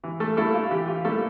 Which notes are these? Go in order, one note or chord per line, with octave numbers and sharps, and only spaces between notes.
E3
A3 A4
G3 A3 A#3 E4 A4
F4
E3 G4
F4
G3 A3 A#3 E4 A4